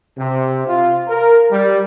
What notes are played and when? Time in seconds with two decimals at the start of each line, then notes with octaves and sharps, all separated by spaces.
0.18 C3
0.67 F4
1.08 A#4
1.52 G3